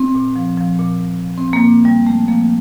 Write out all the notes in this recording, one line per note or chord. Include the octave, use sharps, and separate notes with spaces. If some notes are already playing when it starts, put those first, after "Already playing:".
Already playing: C4
A#2
F3
F3
A#2
A#2
F3
C4
F3
A#3
A#2
A#2 G3
F3 A3
F3 A#3